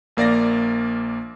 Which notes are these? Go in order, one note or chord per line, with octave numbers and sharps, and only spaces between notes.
A#1 A#3 D5 F5 A#6